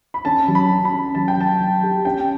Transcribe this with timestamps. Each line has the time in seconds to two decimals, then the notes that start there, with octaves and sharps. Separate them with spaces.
0.14 B5
0.25 C#4 A5
0.48 F#3
0.55 B5
0.71 C#4
0.85 B5
0.93 C#4
1.15 F#3 A5
1.28 G5
1.37 F#3 A5
1.60 F#3
1.83 G4
2.05 C#4 G5